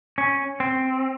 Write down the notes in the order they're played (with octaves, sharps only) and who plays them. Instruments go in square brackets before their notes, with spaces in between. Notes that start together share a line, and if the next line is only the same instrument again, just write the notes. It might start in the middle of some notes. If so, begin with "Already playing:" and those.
[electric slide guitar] C#4
C4